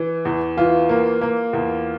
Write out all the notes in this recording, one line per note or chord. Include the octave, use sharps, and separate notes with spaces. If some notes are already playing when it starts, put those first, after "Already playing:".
Already playing: E3
E2
E3 F4
A#3
A#3
E2